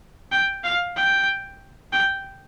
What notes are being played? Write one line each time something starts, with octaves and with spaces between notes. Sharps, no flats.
G5
F5
G5
G5